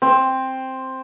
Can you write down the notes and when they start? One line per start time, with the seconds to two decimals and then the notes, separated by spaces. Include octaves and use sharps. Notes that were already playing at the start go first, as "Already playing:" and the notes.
0.02 C4